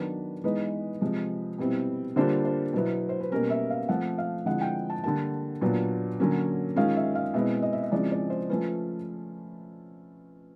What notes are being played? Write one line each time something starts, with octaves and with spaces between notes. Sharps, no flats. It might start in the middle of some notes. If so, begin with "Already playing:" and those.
Already playing: D#3 F#3 B3 D4 B4
E3 G#3 B3 D#4 B4
C3 F3 G#3
B2 G3 C4 E4
D3 G3 A#3 D4 F4 C5
C5
B2 F#3 B3 E4
C5
B4
B2 G3 A#3 C#4 A#4
E5
F5
F3 A3 C4 F#5
F5
D3 F3 G#3 C4 E4 F#5
G5
A5
D3 G3 A#3 A5
A#2 F#3 B3 D4 F4
D3 F#3 A#3 C#4
D#3 G#3 C#4 F4 F5
E5
F5
B2 G#3 C4 E4 E5
D#5
E5
D#5
C#3 F3 G#3 C4 E4 D5
D5
C5
F3 A3 C#4 F4 B4